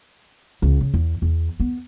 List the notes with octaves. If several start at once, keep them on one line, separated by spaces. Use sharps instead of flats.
C#2
C#3
E2
E2
B3